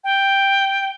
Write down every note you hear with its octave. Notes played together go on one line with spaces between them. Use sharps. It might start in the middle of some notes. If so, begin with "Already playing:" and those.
G5